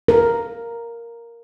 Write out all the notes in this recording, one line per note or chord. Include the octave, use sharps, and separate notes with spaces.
A#4